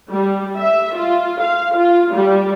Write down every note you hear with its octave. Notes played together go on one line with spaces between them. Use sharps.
G3
E5
F4
F5
F4
G3